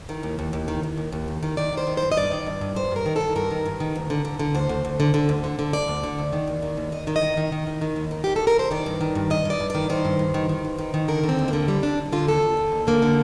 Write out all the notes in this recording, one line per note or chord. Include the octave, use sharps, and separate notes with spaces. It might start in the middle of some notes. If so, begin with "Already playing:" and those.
D#3
D#2
D#2
D#2
D#3
D#3
D#2
D#2
D#3
D#3
D#3 D5
D#3 C5
D#3
G2 C5
D#5
G2 D5
D#3
G2
G2
G2 C5
G2 A#4
D#3
D#3 A4
G2 A#4
D#3
G2
D#3
D2
D3
D3
D3
D2 C5
D2
D2
D3
D3
D2
D3
D3
D2 D5
D2
D3
D2
D#3
D#2
D#3
D#2
D#2 D#5
D#3
D#5
D#3
D#3
D#3
D#3
D#3
D#2
D#3
D#3 G4
A4
D#2
A#4
D#2 C5
D#3 D5
G2
D#3
G2
G2 D#5
G2 D5
G2
D#3 D5
D#3 C5
G2
G2
D#3
D#3
G2
D#3
D#3
D3 A#4
D3
C4
D#2
A#3
D3
D#2 G3
D3 D4
D#2
D3 F4
D#2 A4
D#2
D3
D#2
D3 A#3
D3